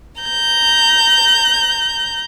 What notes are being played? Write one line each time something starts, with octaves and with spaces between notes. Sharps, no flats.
A#5 G6